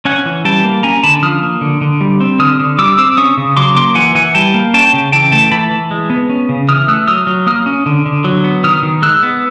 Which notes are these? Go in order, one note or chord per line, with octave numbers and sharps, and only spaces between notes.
C#4 F#5 G#5
E3
G3 G5 A5
A#3
C#4 G#5 A#5
D3 A5 B5
F3 D#6 F6
A#3
D3
D3
G3
C4
D3 D#6 F6
D3
G3 D6 E6
C4 D6 E6
C#4 C#6 D#6
C#3
F#3 C6 D6
A#3 C6 D6
E3 F#5 G#5
E3 F#5 G#5
G3 G5 A5
A#3
C#4 G5 A5
C#3
E3 G5 A5
A3 G5 A5
E3 A5 B5
E3
G#3
B3
C#4
C#3
E3 D#6 F6
A3 E6 F#6
F#3 D#6 F6
F#3
A#3 D#6 F6
C#4
D3
D3
F#3
B3
D#3 D#6 F6
D#3
G#3 E6 F#6
B3